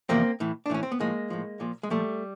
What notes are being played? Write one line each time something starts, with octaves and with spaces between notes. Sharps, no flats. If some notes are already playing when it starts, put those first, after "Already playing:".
E2 C3 F3 A#3 C4
A2 E3
D4
A2 E3 C#4
C4
B3
A2 F3 G#3 A#3
A2 F3
A#2 F3
G#3
A#2 F3 G3 A3